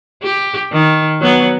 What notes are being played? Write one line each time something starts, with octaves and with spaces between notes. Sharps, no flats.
G4
D#3
F#3 B3